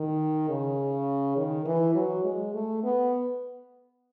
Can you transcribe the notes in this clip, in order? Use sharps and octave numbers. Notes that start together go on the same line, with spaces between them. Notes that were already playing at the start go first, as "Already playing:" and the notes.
Already playing: D#3
C#3
D#3
E3
F#3
G#3
A3
B3